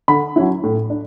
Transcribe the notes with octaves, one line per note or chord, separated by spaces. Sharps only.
D3 B5
F#3 C#4 E4
A2
D4